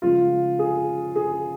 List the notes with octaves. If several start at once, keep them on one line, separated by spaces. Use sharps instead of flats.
C#3 F3 G#3 F4
G#4
G#4